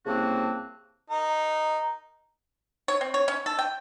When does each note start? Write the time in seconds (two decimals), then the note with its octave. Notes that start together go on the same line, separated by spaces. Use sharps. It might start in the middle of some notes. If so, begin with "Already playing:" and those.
0.06 C2 C#3 A#3 C4 F#4 A5
1.10 D#4 A#4
2.88 C#5
3.01 C4
3.14 C#5
3.28 C#4
3.46 A4
3.59 G5